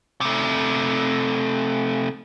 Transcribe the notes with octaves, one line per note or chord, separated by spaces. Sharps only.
C3 A3